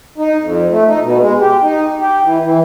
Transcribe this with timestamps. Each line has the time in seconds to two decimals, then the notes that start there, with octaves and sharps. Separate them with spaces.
0.18 D#4
0.41 F2
0.71 A3
0.88 D#4
1.02 B2
1.19 G#3
1.40 G4
1.62 D#4
1.99 G4
2.23 E3
2.43 E3